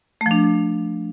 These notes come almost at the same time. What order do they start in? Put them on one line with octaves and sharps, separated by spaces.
A3 F3 D4